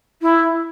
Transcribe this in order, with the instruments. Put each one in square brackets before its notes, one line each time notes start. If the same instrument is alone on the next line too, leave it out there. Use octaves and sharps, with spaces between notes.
[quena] E4